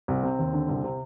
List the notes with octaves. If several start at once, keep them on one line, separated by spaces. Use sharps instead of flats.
C2 C4
C3 C4
D#2
D3
C2
C3